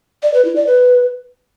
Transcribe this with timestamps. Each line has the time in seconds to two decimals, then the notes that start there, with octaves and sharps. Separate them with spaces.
0.23 D5
0.34 B4
0.45 E4
0.56 D5
0.67 B4